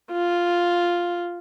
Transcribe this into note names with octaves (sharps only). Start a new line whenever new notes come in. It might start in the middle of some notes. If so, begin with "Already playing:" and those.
F4